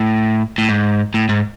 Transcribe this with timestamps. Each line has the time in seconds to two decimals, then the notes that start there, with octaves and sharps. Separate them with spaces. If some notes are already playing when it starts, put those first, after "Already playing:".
Already playing: A2
0.58 A2
0.69 G#2
1.14 A2
1.29 G#2